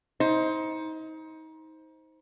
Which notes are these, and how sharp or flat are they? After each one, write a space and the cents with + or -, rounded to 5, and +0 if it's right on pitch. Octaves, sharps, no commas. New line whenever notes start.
D#4 +30 C5 +0